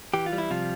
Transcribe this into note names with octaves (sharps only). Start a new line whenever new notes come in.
E3 G4
F4
G3
E4
C3 F3 F4